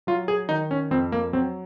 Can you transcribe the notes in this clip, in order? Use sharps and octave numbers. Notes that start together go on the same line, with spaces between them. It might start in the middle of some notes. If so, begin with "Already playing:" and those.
F#3 F4
G#4
D#3 D#4
C#4
F2 C4
A#3
F#3 C4